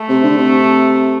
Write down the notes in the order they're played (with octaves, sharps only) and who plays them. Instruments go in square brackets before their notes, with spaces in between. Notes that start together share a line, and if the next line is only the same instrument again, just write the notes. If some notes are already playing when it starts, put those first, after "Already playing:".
Already playing: [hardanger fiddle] A3
[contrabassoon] C3
D3
C3